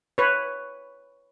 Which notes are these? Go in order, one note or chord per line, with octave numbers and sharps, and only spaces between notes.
B4 C#5